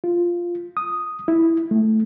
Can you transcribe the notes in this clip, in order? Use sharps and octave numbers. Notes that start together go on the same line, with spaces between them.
F4
D#6
E4
A3